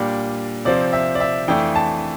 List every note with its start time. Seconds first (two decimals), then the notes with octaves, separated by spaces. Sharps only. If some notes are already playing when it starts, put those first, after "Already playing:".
Already playing: A#2 G3 D4 G4
0.65 C3 F3 C4 D5
0.93 E5
1.15 D5
1.20 E5
1.48 F2 E3 A3 D4 G5
1.75 A5